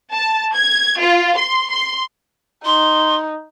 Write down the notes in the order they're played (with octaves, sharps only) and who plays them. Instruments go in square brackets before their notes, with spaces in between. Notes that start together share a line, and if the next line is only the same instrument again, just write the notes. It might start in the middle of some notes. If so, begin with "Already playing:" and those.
[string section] A5
G#6
F4
C6
C6
[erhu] D#4 [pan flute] C6